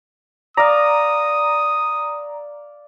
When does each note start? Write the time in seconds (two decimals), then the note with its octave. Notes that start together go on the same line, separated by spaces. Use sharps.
0.57 D5 F5 A#5 D#6